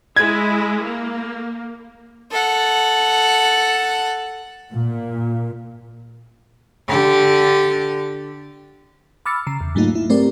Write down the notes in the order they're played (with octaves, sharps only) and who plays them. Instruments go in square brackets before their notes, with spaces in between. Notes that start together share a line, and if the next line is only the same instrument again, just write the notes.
[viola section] G#3 E4 [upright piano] G#6
[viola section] A#3
[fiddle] A4 F#5
[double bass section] A#2
[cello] D3 G4
[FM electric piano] B5 D6 E6 F6 A6 C#7
C#3 A#5 C7
E2
G#2 F#3 A3 A#3 D#4 F4
E4
A3 C4 G4 A#4 D5